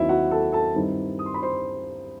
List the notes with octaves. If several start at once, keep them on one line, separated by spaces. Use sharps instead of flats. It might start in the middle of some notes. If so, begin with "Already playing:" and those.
Already playing: D#2 D#3 F#3 C4 D#4 E4 E5
F#4 F#5
A4 A5
A4 A5
G2 D#3 G3 C4 E4
D#6
C6
B5
C5 C6